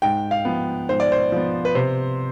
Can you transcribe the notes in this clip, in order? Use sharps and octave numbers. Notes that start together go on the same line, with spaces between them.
G#2 G5
F5
F3 B3
G#2 C5
D5
C5
F3 B3
B4
C3 C5